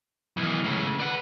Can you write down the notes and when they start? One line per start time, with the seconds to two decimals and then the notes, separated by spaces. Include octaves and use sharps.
0.37 B1 D#3 E3
0.64 C#2 A2 C#3
1.00 B4 D5 F#5